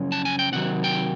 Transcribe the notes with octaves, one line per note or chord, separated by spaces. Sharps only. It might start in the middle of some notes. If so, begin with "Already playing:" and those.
Already playing: F#2 C#3 F3 C#4
A5
G#5
G5
C#2 C3 D#3 F#3 F#5
G5